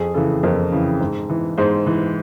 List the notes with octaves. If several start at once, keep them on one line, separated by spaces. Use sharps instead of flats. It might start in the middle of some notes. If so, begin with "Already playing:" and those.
Already playing: F2 G#4
C#3 E3 A4
F2 A#4
C#3 E3
G#2
E3
G#2 C5
E3